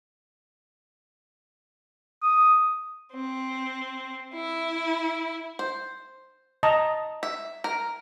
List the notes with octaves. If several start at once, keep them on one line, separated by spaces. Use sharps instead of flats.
D#6
C4
E4
C5
D#5 A5 A#5
E5
A#4